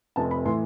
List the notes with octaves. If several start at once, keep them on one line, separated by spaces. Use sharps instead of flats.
F1 F2 C3 A5
B5
A2 E3 C6